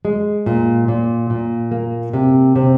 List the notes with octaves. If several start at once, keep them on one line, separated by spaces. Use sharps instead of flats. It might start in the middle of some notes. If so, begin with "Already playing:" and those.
G#3
A#2
A#2
A#2
A#3
C3
C3